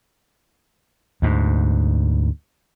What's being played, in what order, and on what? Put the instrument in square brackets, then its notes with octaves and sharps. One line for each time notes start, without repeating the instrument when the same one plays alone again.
[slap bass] D2 G#2